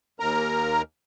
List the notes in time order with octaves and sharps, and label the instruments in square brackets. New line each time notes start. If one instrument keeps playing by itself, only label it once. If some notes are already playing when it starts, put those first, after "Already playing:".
[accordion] D#2 A#4 A#5